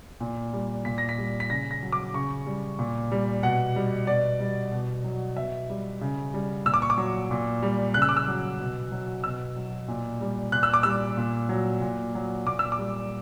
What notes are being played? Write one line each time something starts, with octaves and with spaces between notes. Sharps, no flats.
A#2
G3
A#2 B6
A#6
B6
G3
B6
C#3 A#6
A#6
F#3
D6
C#3 C#6
G3
A#2
G3
B2 F#5
G3
B2 D5
G3
B2
F#3
B2 E5
G3
C#3
G3
A#2 E6
D6
C#6
D6
F#3
A#2
G3
C#3 F#6
E6
D6
E6
F#3
B2
F#3
B2 E6
F#3
A#2
G3
A#2 F#6
E6
D6
G3 E6
A#2
F#3
A#2
F#3
A#2 D6
E6
D6
G3